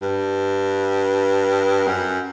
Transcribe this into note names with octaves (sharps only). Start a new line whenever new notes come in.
G2
F#2